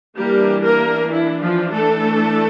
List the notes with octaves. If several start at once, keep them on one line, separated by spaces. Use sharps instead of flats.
E3 G3 A#3 D4 G4
A#3 A#4
E4
F3 F4
A3 A4